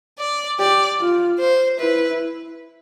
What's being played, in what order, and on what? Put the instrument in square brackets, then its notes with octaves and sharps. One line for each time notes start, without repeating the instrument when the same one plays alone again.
[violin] D5
[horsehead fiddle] G4 [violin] D5
[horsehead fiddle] F4
[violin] C5
[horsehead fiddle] E4 [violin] B4